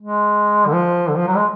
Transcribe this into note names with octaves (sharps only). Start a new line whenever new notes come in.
G#3
D3
F3
D3
F3
F#3
G#3